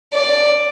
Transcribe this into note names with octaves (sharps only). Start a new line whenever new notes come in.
D5